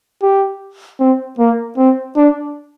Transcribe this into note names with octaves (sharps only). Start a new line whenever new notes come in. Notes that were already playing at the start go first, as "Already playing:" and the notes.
G4
C4
A#3
C4
D4